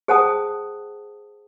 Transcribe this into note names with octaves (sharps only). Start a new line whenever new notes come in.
G#4 C5 F#5 G5 A5 D#6